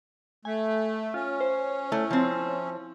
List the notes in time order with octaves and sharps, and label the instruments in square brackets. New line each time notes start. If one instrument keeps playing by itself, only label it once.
[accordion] A3 [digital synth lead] G#5
[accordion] C#4 [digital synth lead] F4
[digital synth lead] C5
[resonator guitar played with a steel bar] A3 [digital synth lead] E4
[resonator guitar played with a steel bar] F3 C4